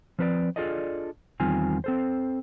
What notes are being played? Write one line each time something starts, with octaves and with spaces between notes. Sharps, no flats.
F3 C4 B4 C#5 D5
D4 F4 G#4 A4 D5 D#5
E2 D#3 G3 C4 F4 G#5
C4 A4 C5